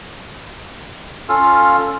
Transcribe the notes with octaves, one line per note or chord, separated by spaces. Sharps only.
C#4 F4 A4 F5